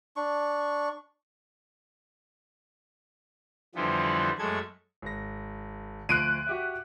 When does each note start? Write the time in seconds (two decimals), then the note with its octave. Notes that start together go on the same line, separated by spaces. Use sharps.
0.16 D4 C#6
3.75 F2 D3 E3 F3 G3 B3
4.38 F#2 G#3 A3 A4 G#6
5.02 G#1 A#6
6.09 D2 F3 F#6 C7 D7 D#7
6.47 F#4 G4 E5